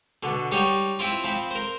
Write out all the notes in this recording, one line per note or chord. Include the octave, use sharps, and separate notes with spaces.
B2 D3
G3 D#4 C#5
C4 E4 F4
F3 C4 B5
A#4 C5